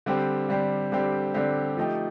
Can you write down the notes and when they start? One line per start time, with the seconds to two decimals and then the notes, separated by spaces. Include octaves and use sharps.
0.06 D3 G3 C4 G4
0.49 D3 G3 C4 G4
0.92 D3 G3 C4 G4
1.34 D3 G3 C4 G4
1.77 F3 A3 D#4 G4